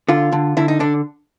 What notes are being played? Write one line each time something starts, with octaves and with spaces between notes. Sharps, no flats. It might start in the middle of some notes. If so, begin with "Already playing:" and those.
D3 F4
D3
D3 E4
D#4
D3 D4